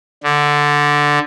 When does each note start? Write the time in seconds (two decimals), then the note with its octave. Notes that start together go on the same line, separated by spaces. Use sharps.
0.23 D3